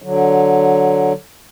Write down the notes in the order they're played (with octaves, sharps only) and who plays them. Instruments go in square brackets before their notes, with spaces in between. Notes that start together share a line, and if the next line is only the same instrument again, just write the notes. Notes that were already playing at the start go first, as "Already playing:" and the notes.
[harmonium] D3 F#3